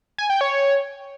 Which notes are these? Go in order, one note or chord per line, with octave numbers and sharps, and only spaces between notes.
G#5
G5
C#5